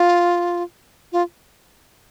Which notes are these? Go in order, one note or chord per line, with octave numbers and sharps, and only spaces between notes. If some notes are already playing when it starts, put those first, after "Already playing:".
Already playing: F4
F4